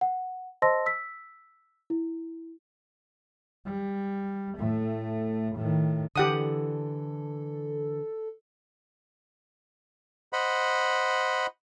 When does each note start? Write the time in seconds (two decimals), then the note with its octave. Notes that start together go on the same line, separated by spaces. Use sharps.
0.01 F#5
0.62 C5 D#5 A5 C6 E6 A#6
0.86 E6 B6
1.90 E4
3.66 G3
4.58 A2 A3
5.56 A2 D#3
6.16 D3 E3 G4 A4 F#5 D#6
10.33 C5 D#5 F#5 B5